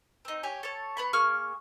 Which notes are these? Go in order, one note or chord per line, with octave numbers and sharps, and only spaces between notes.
C4 D#4
G4 C#5 G#5
A4 C#5
B3 B5 C#6
A#3 G#4 C#6 F6